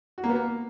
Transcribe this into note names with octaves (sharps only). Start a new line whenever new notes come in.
F#4
A#3
B3
A#3